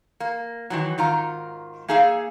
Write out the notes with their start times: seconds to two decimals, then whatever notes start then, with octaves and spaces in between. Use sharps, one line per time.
0.20 A#3
0.70 D#3 E3 F#3
0.98 G#2 D#3 F4 A#5
1.88 A#3 D#4 G#4 E5 F5